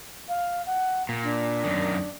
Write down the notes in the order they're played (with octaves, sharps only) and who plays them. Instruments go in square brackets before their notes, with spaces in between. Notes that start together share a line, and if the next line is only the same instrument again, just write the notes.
[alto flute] F5
F#5
[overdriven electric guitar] A#2
[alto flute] D4
[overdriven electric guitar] F#2 D#3